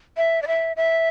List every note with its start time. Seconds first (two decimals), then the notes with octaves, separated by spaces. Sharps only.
0.17 E5
0.42 D5
0.47 E5
0.77 E5